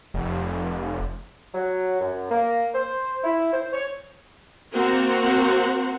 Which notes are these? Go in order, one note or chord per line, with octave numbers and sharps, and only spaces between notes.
F1
F#3
F#2
A#3
C5
E4
C5
C#5
A#3 C4 F#4 C5 F#5 A#5